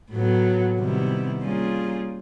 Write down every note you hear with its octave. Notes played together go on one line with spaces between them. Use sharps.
A2 F#3 B3
C3 D#3 G3 B3 E4
G3 A#3 C#4 F4 G#4